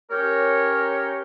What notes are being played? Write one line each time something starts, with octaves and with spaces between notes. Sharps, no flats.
C#4 G4 A#4 C#5